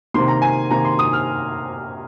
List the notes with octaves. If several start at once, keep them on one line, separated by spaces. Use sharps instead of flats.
C3 D#3 A#3 C6
A#5
G#5
C3 D#3 A#3 A#5
C6
D#6
F6